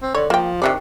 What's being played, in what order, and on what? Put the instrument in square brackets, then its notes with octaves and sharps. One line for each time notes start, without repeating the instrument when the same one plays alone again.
[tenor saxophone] C4
[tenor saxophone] D3 [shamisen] C#5
[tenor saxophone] F3 [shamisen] A#3 G5
[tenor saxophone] C3 [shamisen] D#3 D4 D5